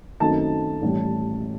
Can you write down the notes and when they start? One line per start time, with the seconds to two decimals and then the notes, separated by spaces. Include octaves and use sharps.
0.20 F#2 D#3 A3 C4 D#4 A5
0.82 A1 A2 G3